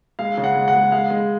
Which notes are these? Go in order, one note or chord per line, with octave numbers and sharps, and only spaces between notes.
G#3 F5
C#3
F#5
G#3
F#5
G#3
G#3 F5
G#3